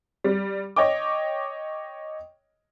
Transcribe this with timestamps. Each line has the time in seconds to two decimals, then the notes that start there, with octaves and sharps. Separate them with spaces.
0.24 G3
0.76 C#5 D#5 G5 D6